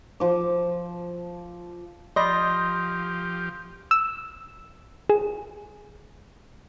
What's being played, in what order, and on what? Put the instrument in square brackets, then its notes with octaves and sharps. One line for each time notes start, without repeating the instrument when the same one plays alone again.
[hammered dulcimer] F3 D6
[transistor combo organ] F3 G4 [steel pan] D5 D#5 B5 [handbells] C6 D#6 A#6
[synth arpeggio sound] E6
G#4